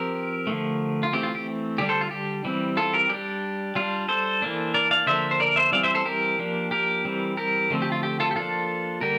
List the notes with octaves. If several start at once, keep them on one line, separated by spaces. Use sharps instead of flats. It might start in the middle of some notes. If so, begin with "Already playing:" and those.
Already playing: F3 C4 G4 A#4
D3 F3 A3
F4
E3 A3 C4 G4
F4
G4
D3 G3 D4 G4
A4 C5
F4
G4
E3 G3 C4
F4 A4
G4 A#4
G3 D4 G4
G3 D4 F4
A4 C5
E3 A#3 D4
A#4 D5
D5 F5
D3 F3 A#3 D4 C5 E5
C5
A#4 D5
C5 E5
E3 G3 C4 D5 F5
C5 E5
A4 C5
G4 A#4
F3 A#3 D4
G4 A#4
E3 G3 C4
G4 A#4
D3 F3 A3 C4
G4
F4
G4
F4 A4
G4
F3 A#3 D4 F4 A4
D3 G3 A#3 G4 A#4